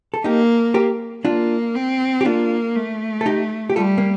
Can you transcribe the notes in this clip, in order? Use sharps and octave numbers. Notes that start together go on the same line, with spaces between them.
A4
A#3 D#4 G4
G4 A#4
A#3 D4 F4
C4
G4
A#3 D4 F4
A3
A4
D#4 G4
G4
G3 F4 A4
A#3